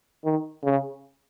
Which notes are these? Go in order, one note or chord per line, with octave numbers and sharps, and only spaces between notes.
D#3
C#3